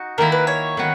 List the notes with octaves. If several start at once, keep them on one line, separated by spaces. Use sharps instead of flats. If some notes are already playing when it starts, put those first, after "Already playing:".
Already playing: D#4 F#4
D#3 A#3 E4 A#4
B4
C#5
D#3 F#3 B3 F#4